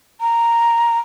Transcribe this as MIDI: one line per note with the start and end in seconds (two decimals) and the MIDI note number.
0.21 0.99 82